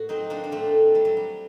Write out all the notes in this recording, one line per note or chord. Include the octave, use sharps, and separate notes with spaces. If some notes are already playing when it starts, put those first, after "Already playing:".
Already playing: A2 F#4
F#3 C4 D#4
A#3 D4
D4
A2 A3 C4
F#3 G3
F#3
G3